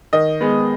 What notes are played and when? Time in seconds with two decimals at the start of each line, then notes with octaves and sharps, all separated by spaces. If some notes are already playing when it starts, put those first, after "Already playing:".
0.13 D#3 D#5
0.41 G#3 B3